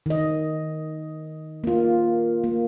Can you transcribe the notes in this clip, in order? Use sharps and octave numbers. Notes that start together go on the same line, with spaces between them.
D#3 D#5
A#3 F4
A#3